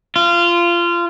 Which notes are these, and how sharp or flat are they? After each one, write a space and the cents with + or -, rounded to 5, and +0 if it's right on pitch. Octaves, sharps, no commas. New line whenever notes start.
F4 -20